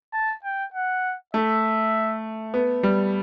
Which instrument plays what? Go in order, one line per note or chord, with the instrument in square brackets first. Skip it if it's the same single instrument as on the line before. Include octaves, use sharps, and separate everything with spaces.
[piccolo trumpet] A5
G5
F#5
[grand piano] A3 [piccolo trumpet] E5
[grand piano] B3
G3